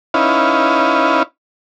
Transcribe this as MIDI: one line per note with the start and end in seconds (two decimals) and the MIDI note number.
0.14 1.23 61
0.14 1.23 63
0.14 1.23 64
0.14 1.23 71
0.14 1.23 77